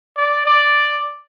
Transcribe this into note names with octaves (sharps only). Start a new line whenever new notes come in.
D5
D5